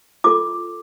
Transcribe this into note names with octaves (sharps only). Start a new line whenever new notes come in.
F4 A4 D6